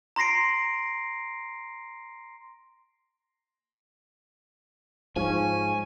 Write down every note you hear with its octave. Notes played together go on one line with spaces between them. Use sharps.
A#5 C6 A#6 C7 D7
G#2 F3 C#4 G#5